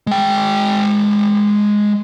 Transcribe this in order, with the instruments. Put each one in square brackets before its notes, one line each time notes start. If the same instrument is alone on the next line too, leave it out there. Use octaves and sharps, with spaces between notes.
[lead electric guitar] G#3 G5